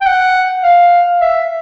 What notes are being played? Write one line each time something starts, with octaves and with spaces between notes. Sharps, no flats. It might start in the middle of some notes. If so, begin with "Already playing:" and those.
G5
F#5
F5
E5